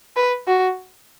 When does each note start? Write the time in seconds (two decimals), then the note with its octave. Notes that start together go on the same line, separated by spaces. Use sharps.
0.16 B4
0.48 F#4